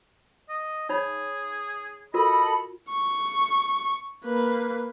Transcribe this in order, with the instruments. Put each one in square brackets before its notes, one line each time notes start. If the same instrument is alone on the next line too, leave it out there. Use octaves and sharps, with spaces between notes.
[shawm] D#5
[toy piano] D#4 C#5 B5 [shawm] G#4
[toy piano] F4 F#4 A#4 [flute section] A4 B5 [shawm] D#5
[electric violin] C#6
A#3 B4